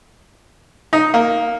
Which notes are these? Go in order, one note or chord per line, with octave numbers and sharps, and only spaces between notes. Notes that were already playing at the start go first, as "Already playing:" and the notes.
D#4
A#3